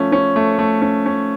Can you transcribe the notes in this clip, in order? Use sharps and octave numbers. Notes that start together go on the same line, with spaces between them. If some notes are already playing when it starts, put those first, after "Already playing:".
Already playing: F3 A3 C#4
C#4
A3
A3
C#4
C#4